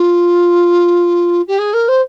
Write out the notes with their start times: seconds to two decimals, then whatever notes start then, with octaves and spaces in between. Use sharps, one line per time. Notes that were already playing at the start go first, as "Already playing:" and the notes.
Already playing: F4
1.47 G4
1.58 G#4
1.73 A#4
1.88 C5